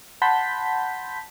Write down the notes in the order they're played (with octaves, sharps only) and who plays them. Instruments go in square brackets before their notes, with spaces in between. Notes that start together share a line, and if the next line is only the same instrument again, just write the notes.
[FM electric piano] F#5 A5 B5 C6 G6 B6